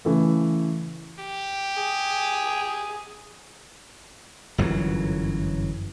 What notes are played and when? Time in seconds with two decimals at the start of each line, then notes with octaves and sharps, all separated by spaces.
0.05 C#3 E3 A3
1.20 G4
1.77 G#4
4.58 G1 F#2 E3 F#3